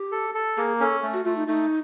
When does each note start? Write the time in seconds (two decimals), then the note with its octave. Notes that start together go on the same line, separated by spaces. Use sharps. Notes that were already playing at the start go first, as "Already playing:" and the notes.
Already playing: G4
0.12 A4
0.35 A4
0.57 A#3 G#4
0.80 C#4 A4
1.03 A3
1.13 F#4
1.25 A3 F4
1.37 D#4
1.48 A3 D#4